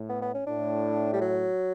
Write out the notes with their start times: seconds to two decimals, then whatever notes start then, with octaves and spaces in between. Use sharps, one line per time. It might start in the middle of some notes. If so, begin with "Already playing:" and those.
Already playing: A2
0.09 B3
0.22 B3
0.34 C#4
0.47 A2 D4
1.13 G3
1.21 F#3